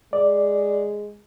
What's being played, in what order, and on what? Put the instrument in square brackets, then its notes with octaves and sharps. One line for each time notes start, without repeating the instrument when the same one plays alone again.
[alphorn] G#3 [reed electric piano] D5